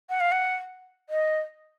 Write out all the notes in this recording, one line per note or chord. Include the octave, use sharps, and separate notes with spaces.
F#5
F5
F#5
D#5